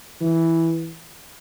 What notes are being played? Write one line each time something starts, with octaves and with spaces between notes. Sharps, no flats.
E3